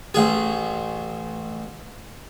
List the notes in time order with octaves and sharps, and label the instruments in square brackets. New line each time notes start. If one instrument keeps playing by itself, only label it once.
[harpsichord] A1 G#4